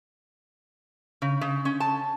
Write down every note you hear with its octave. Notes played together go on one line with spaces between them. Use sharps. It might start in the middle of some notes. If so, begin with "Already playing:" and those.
C#3
C#3
C#4
A5